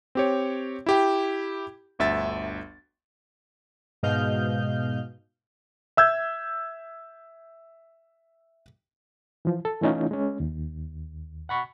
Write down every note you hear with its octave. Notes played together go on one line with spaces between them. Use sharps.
C4 G4 C#5
E4 G4 G5
G1 D2 E5 A6
G#2 B2 D#5 F5 F6 G6
E5 E6 G6 G#6
E3 F3
A4
E3 A3 C#4 D#4 F4
G#3 C#4
D#2
F#5 B5 C#6